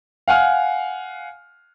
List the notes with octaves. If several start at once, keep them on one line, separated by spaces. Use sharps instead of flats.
F5 F#5 G#5 F6